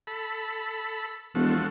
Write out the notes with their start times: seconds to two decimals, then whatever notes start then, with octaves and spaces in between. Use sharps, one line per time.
0.07 A4 B5
1.35 E1 F3 F#4 A4